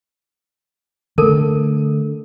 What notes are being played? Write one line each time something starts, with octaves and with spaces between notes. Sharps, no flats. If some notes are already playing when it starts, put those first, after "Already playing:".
D3 A3 A4 A#4 A5